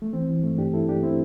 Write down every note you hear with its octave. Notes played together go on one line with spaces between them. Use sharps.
A3
E3 C4
E3
G2 A3
G2 D4 G4
G2 E4 A4
G2 D4 G4
C4 E4